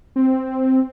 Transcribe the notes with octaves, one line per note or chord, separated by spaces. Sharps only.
C4